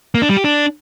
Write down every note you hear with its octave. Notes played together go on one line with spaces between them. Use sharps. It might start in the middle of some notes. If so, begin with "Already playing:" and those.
A#3
D4
G3
G4
D4